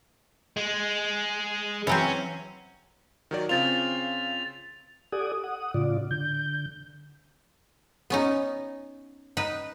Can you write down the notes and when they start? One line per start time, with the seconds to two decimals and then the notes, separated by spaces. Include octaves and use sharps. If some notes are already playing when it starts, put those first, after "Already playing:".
0.57 G#3
1.87 E3 F#3 C4 C#4
3.31 D#3 F#3 D5
3.49 C#3 C4 F4 A6 F7
5.12 G4 A4 D5 F#5 G#5 D#6
5.44 F#5 D#6
5.74 A2 C#3 F4 D5
6.11 D3 G6
8.10 B3 C#4 D#4
9.37 D#4 B4